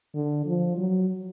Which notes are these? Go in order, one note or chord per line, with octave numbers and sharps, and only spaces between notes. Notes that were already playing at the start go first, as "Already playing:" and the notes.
D3
F3
F#3